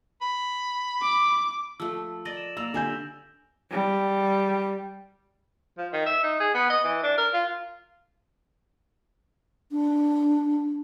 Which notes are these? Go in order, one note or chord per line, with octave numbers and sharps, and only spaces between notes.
B5
D6
F3 A3 E6
A#4 D5 D#5 A6 A#6 F#7
E7
A#3 E6 A6 F7
D3 A#3 G4 G#5 G6
G3
F3
D#3
E5
D#4
G#4
B3
D#5
E3
D4
A#4
F4
D4